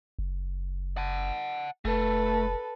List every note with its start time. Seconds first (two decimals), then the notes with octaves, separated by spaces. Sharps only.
0.19 F#1
0.97 F#5 A5
1.85 F1 A3 A4 B4